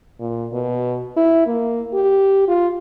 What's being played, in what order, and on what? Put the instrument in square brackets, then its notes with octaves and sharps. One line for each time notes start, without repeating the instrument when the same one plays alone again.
[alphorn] A#2
B2
E4
A#3
G4
F4